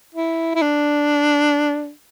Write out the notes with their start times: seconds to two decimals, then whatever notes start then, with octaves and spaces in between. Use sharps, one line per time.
0.15 E4
0.55 E4
0.62 D4